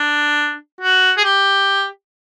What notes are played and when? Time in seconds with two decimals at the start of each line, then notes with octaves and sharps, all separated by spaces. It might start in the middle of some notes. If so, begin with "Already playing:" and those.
Already playing: D4
0.81 F#4
1.18 G#4
1.24 G4